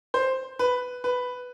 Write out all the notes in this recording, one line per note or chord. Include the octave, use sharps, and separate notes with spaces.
C5
B4
B4